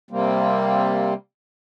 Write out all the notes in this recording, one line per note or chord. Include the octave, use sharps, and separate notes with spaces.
C3 G3 A#3 C4